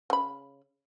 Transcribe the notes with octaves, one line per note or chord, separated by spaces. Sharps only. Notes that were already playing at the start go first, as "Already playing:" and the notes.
C#3 B5